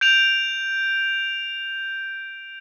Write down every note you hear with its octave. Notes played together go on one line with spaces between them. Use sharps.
G6 D7 F7